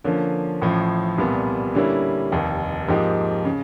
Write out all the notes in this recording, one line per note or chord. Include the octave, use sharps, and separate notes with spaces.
D3 F3 A#3 C#4
A1 A2 F3
C2 A#2 G3 B3
D3 G3 A#3 C#4 E4
F1 D#2 D#3
G#2 F3 A#3 D#4 G4
C#3